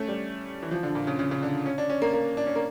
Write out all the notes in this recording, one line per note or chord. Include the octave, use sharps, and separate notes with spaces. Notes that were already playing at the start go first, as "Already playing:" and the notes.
Already playing: A3 C#4
G3
E3
F3
D3
A#2
C#3
C#3
C#3
D3
C#4
D4
C#4
A#3
A#3
D4
C#4
A#3